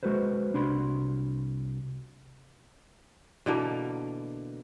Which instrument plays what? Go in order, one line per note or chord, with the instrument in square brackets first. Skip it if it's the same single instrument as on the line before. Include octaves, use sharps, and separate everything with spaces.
[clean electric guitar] G#3 F#4 A4 B4 C5
C2 D4 F#4 B5 C6
[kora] B2 D3 E3 A#3